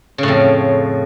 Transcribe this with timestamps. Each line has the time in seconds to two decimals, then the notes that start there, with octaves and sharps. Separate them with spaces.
0.18 C#3
0.23 A2
0.28 F2